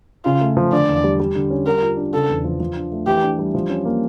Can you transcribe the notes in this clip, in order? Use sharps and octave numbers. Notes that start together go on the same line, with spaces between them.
C#3 F4
A3
F3
D3 D5
E2
G3
G3
D3
C#4
G3 A#4
F4
D4
C#3 A4
E2
F3
F3
D4
A3
E3 G4
D4
G3
F3
C#4
A#3